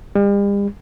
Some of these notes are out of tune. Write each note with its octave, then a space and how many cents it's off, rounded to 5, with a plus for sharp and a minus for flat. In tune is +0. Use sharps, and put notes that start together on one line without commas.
G3 +45